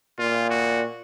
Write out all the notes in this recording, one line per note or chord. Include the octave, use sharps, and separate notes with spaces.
A#2 F4
F#4